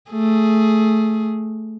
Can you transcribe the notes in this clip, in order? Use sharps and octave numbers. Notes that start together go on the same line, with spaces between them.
A3 G#4